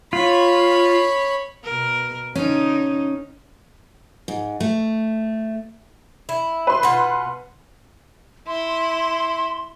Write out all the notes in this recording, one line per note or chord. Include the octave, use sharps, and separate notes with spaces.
F4 C#5 B5
B2 A#4
D3 C#4 D#4
G#2
A3
E4
B4 C6
B2 F4 F#5
E4 C6